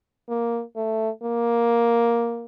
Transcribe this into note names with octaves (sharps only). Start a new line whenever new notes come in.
A#3
A3
A#3